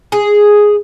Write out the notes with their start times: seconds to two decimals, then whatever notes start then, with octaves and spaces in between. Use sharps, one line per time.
0.12 G#4